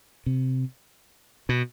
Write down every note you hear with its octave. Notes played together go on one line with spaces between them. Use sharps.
C3
B2